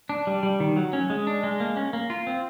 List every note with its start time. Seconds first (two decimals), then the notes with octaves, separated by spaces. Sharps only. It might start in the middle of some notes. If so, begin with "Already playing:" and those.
0.09 D4
0.27 G3
0.43 G3
0.60 D#3
0.76 F#3
0.93 C#4
1.10 G#3
1.27 D4
1.43 G#3
1.60 A#3
1.77 C#4
1.93 A#3
2.10 F4
2.27 C4